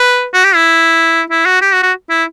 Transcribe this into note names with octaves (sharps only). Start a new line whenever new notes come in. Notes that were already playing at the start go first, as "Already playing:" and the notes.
Already playing: B4
F#4
G4
E4
E4
F#4
G4
F#4
F#4
E4